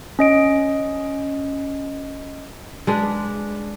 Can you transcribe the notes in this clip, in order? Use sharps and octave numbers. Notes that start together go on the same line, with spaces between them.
C#4 D#5 D7
G#3 D4 B4